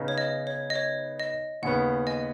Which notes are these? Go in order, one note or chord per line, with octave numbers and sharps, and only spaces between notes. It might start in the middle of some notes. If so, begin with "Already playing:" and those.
Already playing: C#3 B3 D#4
C#5
D#5
C#5
D#5
C#5
D#5
D#2 C#3 B3 F#5
D#5 G#5